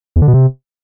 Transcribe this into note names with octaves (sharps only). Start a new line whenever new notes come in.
E2
D3
B2
C3